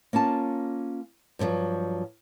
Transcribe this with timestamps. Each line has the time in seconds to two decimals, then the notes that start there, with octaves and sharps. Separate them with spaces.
0.13 A#3 C#4 F4 A5
1.39 G2 A#2 D#3 F3 F#3